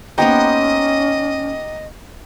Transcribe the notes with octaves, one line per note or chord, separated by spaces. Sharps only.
A#3 B3 C#4 D#4 G4 C5 D#5 G5